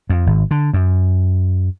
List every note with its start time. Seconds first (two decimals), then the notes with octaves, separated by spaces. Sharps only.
0.10 F2
0.26 G#1
0.51 D3
0.74 F#2